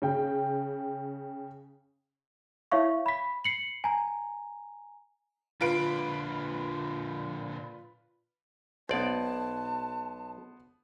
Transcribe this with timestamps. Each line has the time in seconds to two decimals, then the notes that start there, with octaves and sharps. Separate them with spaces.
0.02 C#3 G5
2.71 E4 C#5 E5 F5 C#6
3.06 B5 B6
3.45 C7 C#7 F#7
3.84 G#5 A#5
5.61 A#2 D3 F4 B4 D7
8.89 B1 B3 C5 D5 A5